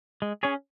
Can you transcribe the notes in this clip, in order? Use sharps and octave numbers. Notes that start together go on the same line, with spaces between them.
G#3
C#4 G#4 C#5